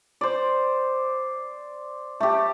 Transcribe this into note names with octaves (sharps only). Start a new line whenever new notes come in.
C5 D5
A3 G4